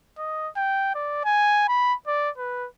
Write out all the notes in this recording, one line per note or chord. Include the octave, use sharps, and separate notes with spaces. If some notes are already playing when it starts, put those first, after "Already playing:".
D#5
G5
D5
G#5
B5
D5
B4